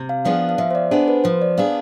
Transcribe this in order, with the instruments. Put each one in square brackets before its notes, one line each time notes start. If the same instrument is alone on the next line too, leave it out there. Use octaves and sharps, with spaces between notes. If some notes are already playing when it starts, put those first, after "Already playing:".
Already playing: [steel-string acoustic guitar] C3
[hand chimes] F5
[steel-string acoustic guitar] F3 B3 D4 G#4 [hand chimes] F5
[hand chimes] F5
[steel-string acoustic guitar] F3 [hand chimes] E5
[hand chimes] C5
D5
[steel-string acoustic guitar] B3 D4 G#4 [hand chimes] C5
[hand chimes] B4
[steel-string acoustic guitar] F3 [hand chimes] C5
[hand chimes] D5
[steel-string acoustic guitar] B3 D4 G#4 [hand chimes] F5